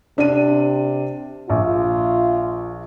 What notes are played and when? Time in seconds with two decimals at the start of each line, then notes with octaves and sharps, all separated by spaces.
0.18 C3 D4 D#7
1.50 A#1 F4